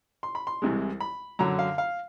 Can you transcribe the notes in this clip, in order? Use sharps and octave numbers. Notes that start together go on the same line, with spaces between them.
C6
B5
C6
C2 C3 E3 G#3
B5
F#2 D3 F#3 A#5
F5
F5